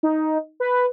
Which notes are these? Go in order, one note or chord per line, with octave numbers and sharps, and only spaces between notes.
D#4
B4